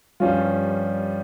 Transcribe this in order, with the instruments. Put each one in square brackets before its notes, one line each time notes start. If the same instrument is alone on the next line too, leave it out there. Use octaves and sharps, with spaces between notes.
[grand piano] G2 F3 C#4 F4 [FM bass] G3